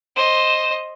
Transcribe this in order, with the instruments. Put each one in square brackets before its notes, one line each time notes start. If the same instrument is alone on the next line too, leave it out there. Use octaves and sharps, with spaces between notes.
[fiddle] C5 D#5